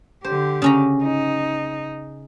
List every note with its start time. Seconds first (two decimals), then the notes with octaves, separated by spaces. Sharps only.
0.24 D3 G4 C5
0.62 C#3 C#4 A#5
1.03 D#4